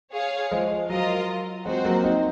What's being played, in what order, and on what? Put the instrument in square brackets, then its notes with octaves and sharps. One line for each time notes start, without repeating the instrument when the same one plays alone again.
[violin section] G#4 C#5 F5
[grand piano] F3 G#3
[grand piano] F#3 [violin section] F4 A#4 D#5
[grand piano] F3 G#3 [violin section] C4 F#4 C5
[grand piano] F#3 A#3
C4 D#4